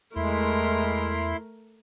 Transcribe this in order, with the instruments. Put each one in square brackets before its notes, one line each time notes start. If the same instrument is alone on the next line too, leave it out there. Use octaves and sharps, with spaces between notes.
[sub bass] E2 [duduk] G#3 [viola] A3 A#4 [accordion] E4 C6